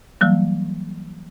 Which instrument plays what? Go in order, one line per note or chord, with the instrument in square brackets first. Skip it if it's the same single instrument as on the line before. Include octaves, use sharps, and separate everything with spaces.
[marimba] E3 F#3 G3 A#3